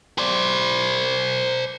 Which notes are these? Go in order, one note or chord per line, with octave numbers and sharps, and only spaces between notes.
C5 D5